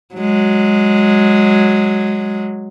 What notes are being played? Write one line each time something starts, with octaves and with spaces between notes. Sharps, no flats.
F#3 G#3